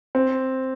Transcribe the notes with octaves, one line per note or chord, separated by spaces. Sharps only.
C4